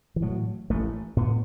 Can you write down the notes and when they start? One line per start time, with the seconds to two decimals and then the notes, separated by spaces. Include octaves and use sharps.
0.16 E3
0.22 A2 F#3
0.70 A1 A3
1.17 A2 B3